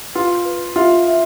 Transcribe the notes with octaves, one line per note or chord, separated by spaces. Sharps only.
F4 B4
B4
F4 E5
E5